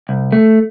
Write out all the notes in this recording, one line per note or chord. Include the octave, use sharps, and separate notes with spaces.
C2
A3